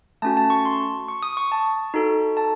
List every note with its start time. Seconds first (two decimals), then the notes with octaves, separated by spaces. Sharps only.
0.22 A3 C#4 F#4 A5
0.37 A5
0.50 C#6
0.65 C6
1.08 C#6
1.23 D#6
1.37 C#6
1.52 A5
1.94 D#4 F#4 A4
2.37 A5